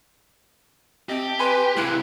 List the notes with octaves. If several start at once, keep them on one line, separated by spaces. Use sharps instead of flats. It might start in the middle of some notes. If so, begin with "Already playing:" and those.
C4 G4 D#5 A5
B4 G#5 B5 C6
C3 G#3 A#3 E4 F#6